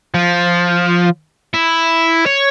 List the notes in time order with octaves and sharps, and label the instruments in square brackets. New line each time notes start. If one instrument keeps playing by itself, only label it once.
[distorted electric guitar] F3
E4
C#5